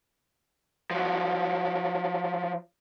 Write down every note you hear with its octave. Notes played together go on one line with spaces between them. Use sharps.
F3 F#3